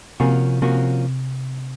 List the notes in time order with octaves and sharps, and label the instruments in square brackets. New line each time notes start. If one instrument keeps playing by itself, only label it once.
[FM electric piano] C3 [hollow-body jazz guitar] F3 A#3 C#4 F#4
[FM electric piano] C3 [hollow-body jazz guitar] F3 A#3 C#4 F#4